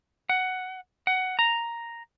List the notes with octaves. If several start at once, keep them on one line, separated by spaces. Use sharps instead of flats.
F#5
F#5
A#5